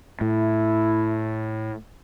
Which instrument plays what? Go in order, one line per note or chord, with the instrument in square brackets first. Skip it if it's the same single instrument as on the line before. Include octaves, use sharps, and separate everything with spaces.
[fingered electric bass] A2 [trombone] E4